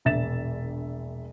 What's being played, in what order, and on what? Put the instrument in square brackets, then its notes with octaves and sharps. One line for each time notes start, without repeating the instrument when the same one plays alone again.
[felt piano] E1 A#1 E5 A6 E7